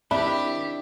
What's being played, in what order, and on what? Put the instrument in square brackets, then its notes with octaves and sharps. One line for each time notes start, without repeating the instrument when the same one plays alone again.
[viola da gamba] D#3 E4 G4 [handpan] C4 E5 [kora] D4 [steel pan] B5